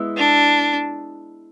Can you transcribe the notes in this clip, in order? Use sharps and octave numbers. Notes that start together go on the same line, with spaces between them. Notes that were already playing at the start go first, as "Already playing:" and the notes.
Already playing: G#3 B3 E4
D4